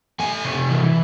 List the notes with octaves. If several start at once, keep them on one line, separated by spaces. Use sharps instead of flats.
A3 G#5
C3
E3